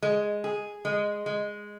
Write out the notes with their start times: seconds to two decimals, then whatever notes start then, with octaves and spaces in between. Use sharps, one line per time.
0.03 G#3
0.44 G#4
0.85 G#3
1.26 G#3